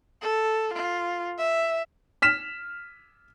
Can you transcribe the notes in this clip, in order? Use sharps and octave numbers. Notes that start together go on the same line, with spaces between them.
A4
F4
E5
F6 B6 E7